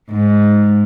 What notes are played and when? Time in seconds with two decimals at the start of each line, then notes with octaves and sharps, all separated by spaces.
0.11 G#2